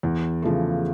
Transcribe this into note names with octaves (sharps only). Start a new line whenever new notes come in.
E2
C#3 F3 A3